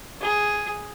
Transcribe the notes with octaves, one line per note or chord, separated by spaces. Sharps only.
G#4